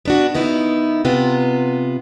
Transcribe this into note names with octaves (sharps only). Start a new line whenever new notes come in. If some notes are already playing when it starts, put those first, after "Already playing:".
B3 D4 F#4
D#3 B3 D#4 E4
C3 B3 F4